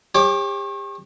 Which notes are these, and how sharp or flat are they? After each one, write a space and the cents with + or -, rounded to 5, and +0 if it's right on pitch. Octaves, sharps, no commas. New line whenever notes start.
G4 +35 C#5 -35 D6 +0